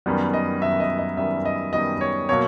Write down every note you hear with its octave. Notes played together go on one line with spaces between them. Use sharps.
F#2 D#3 G3 B3
D#5
F#2 D#3 G3 B3 E5
D#5
D#5
F#2 D#3 G3 B3 E5
D#5
F#2 D#3 G3 B3 D#5
C#5
B2 F#3 A#3 C#5